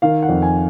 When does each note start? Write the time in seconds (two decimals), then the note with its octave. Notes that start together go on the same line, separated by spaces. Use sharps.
0.02 D#3 F5
0.22 F#5
0.29 F2
0.42 G#5